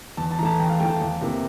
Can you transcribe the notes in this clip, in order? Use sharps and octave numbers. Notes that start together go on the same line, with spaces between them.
E2 A5
A5
E3 A3 A5 A#5
E2 G5
F5
E3 A3 G5
A5
E2
C3 E3 A#3